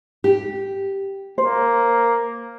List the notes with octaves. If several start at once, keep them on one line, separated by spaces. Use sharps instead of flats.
G4
A#3 C5